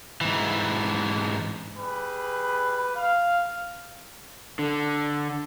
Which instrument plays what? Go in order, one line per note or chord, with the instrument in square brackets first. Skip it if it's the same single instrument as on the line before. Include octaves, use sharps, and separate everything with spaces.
[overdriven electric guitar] G#2 E3
[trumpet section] G3 G#4 B4
F5
[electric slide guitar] D3